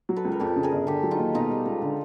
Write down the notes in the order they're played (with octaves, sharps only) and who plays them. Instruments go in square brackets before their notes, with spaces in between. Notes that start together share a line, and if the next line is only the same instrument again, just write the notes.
[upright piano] F#3
[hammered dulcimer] A4 B4
[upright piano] C#2
[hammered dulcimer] A#4
[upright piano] F2 [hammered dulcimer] G4 A4
[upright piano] C#3
[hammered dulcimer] G#4 A#4
[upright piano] G1
[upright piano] D3 [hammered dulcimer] G4 A4
[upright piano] F#3
[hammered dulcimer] D#4 F4
[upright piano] D#2
[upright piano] B2 [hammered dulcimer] D#4 F4
[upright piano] G3
C#2
D3